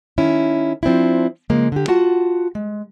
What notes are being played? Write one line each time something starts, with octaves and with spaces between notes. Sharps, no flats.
D#3 C#4 E4
F3 C4 D4 E4
C#3 F3 G#3 A#3
D3 G4
F4 F#4 F#5 A5
G#3